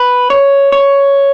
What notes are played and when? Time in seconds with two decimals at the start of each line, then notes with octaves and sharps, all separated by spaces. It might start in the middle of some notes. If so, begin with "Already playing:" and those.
Already playing: B4
0.30 C#5
0.72 C#5